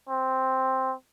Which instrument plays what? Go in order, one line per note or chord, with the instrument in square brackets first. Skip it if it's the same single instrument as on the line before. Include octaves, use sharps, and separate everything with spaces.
[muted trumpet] C4